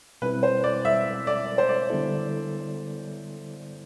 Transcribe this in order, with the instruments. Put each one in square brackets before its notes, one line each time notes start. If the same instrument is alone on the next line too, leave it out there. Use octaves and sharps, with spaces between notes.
[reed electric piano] B2 G3 C4 E4 [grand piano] B4
[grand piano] C5
D5
E5
D5
C5
D5
[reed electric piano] D3 G3 B3 E4 A4